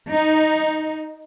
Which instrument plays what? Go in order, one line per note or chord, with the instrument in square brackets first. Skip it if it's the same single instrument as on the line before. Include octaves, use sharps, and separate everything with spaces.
[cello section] D#4